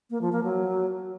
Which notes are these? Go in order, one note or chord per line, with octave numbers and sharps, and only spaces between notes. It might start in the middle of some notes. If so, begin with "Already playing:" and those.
A#3
F3
A#3
F#3